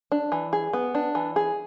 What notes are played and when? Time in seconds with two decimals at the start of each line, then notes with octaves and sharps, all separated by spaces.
0.12 D4
0.32 E3
0.53 G#4
0.73 B3
0.95 D4
1.15 E3
1.36 G#4